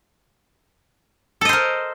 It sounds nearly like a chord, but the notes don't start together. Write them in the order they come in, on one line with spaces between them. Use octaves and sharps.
A4 D#5 C5 A#4